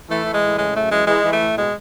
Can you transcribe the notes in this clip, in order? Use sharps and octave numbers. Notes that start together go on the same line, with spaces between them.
E3 A3
E3
G#3
A2
C#3 G#3
F#2 A3
E3 G#3
E3 G#3
E3
A3
A2
B2 G#3